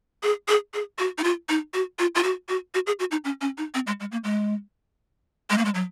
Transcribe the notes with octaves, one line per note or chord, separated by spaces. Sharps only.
G#4
G#4
G#4
F#4
D#4
F4
D#4
F#4
F4
F4
F#4
F#4
F#4
G#4
F#4
D#4
C#4
C#4
D#4
C4
G#3
G#3
A#3
G#3
G#3
A#3
G#3
F#3